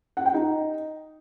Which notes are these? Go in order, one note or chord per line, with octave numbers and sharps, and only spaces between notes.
F#5
G5
D#4